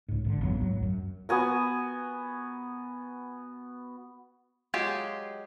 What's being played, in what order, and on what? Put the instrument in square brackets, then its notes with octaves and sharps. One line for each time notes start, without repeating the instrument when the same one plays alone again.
[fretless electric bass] C#2 G#2
G#1 B2 D3
G#1 F2 F#3 B3
G#1 D2 A2 F#3
F#2
[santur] B3 F#4 G#5 A#5
[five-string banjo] F#3 G#3 F4 G4